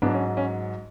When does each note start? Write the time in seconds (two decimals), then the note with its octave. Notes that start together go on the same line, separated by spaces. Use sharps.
0.02 G#2 F#3 B3 D4
0.14 C#4
0.37 C#4